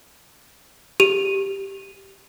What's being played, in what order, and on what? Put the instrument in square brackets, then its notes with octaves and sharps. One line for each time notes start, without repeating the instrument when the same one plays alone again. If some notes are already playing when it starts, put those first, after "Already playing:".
[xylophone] G4 D#7 F7